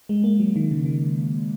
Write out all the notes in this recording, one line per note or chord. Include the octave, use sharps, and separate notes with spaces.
G#3
A#3
F#3
D#3
C#3
D#3